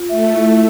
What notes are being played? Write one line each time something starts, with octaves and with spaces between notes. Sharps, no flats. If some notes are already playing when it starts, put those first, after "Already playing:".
Already playing: F4
A3 E5
E4